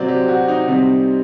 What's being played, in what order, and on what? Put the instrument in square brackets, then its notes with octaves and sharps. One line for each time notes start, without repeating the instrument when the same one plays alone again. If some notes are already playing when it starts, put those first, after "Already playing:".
Already playing: [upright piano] C3 F#3 C4 D5
G4
F#4
D#4
C3 G3 C4